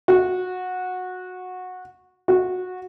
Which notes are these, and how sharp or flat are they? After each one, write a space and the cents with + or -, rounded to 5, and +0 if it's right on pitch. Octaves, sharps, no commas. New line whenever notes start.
F#4 -15
F#4 -15